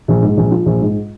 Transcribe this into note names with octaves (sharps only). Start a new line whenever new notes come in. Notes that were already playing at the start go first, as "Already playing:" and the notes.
A#1
G#2
A#1
F3
A#1
G#2